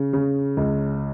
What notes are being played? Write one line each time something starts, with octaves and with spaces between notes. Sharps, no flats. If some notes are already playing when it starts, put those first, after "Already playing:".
Already playing: C#3
C#3
C#2